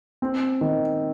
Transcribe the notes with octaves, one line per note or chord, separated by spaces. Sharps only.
C4
D#3